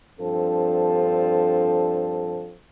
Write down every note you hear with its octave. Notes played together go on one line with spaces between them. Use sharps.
G2 F3 C4 D4 A4